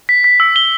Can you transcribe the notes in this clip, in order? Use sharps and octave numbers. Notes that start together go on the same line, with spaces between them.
B6
B6
E6
G7